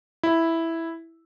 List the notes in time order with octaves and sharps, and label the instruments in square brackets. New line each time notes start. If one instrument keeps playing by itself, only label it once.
[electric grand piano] E4